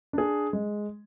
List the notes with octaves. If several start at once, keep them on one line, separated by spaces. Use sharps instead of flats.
D4 G#4
G#3